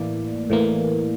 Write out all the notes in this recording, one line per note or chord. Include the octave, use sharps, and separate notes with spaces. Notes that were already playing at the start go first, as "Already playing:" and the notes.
Already playing: A2 E3 A#3 D5
A2 E3 A#3